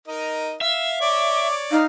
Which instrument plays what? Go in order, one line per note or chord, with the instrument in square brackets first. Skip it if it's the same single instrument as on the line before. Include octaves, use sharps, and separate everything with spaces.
[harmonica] D#4 A#4 D#5
[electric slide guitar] E5 [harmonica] F5
[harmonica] C#5 D5 [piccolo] D6
[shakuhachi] D#4 [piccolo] F5